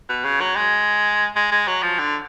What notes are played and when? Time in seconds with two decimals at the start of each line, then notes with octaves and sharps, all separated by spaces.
0.09 B2
0.25 C#3
0.41 F#3
0.56 G#3
1.36 G#3
1.52 G#3
1.67 F#3
1.83 F3
1.99 D3